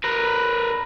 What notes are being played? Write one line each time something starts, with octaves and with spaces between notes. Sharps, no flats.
A#4 B4